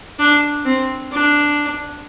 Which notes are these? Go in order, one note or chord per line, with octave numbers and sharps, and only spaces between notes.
D4
C4
D4